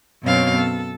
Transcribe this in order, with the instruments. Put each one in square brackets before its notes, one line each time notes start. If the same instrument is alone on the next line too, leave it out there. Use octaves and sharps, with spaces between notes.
[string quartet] F#2 B2 B3 C4 C#5 F5
A4